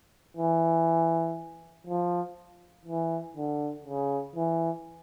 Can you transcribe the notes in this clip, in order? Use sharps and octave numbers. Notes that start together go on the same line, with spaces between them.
E3
F3
E3
D3
C#3
E3